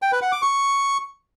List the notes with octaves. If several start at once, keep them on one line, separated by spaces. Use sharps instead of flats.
G5
B4
F#5
D6
C#6